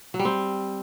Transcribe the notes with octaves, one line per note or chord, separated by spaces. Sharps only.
F#3
G3
C4